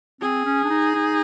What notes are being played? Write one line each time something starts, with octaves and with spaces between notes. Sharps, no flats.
C4 G#4
C#4
D4
D#4
D#4